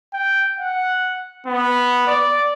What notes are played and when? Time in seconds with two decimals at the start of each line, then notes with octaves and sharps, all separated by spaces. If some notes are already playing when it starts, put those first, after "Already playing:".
0.14 G5
0.60 F#5
1.47 B3
2.07 D5